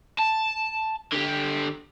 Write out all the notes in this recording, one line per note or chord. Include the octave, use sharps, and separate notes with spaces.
A5
D3 G4